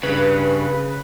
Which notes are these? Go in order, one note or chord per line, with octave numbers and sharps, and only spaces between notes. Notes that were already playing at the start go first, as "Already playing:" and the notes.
G2 C#3 B4